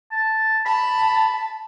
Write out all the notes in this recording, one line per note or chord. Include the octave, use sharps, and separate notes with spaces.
A5
A5 B5